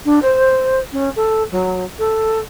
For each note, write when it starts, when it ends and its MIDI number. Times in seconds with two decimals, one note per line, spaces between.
0.05 0.19 62
0.22 0.79 72
0.92 1.09 61
1.15 1.43 69
1.51 1.84 54
1.99 2.39 69